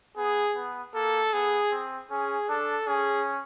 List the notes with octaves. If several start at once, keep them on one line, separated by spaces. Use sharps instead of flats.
B3 G#4
B3
A#3 A4
B3 G#4
C4
C#4 G#4
D4 A4
C#4 G#4